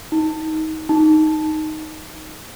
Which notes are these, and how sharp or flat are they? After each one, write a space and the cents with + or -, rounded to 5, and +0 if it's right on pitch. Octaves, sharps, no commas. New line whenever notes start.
D#4 +20
D#4 +0